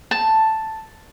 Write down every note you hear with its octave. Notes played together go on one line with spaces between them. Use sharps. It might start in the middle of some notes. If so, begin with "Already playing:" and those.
A5